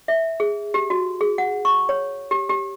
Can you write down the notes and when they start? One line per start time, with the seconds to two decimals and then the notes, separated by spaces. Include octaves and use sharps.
0.08 E5
0.40 G#4
0.74 G4
0.90 F#4
1.21 G#4
1.38 F#5
1.65 C#6
1.89 C#5
2.31 G4
2.50 G4